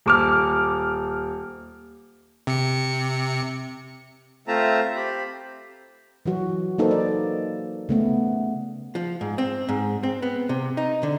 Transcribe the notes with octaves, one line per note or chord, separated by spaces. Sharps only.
D#1 D6 F6
C3 C#7
A3 C4 F4 E5 A5 A#5
C4 G4 B5
E3 F#3 F#4
A#3 D#4 A4 B4 C5
D5
C#3 A3 B3
F3
G#2
C4
G#2
C4
B3
C3
D#4
D3